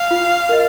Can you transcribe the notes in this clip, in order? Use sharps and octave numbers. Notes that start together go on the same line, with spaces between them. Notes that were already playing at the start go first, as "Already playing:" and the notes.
Already playing: F5
F4
A#4 D#5